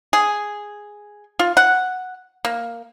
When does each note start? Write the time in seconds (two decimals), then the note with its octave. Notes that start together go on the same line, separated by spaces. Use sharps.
0.13 G#4
1.39 F4
1.57 F#5
2.45 A#3